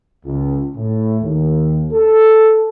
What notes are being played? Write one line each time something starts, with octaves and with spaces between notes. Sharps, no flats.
C#2
A2
D#2
A4